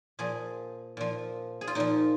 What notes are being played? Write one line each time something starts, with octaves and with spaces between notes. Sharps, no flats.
A#2 F3 G#4
A#2 F3
G#4
F4
A#2 F3 D#4